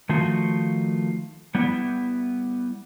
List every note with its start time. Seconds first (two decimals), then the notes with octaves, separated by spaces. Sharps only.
0.09 D#3 F3 A3 D#4 F4 F#4
1.55 G3 B3 E4